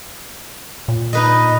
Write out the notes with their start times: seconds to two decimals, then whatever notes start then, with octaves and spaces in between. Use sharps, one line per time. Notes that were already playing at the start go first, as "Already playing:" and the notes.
0.88 A#2
1.13 D#4 B4 D#5